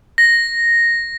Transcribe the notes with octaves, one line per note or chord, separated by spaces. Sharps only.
A#6